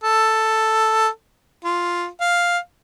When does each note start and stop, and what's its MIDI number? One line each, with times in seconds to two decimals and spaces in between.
0.04 1.08 69
1.64 2.07 65
2.21 2.58 77